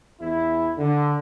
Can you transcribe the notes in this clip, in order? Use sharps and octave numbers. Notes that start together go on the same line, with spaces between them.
E2 E4
D3